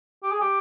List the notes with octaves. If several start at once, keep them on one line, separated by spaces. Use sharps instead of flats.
G4
G#4
G4